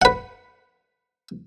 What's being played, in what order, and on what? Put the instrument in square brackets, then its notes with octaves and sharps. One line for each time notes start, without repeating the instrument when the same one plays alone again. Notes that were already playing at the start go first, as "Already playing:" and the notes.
[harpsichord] B4 F#5